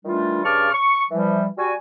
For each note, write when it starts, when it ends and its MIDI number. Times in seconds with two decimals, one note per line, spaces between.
0.05 0.41 51
0.05 0.41 52
0.05 0.41 55
0.05 0.41 57
0.05 0.41 62
0.05 0.41 65
0.43 0.69 43
0.43 0.69 49
0.43 0.69 81
0.43 0.69 85
0.43 0.69 86
0.43 0.69 89
0.71 1.02 85
1.11 1.47 52
1.11 1.47 53
1.11 1.47 55
1.58 1.74 55
1.58 1.74 66
1.58 1.74 80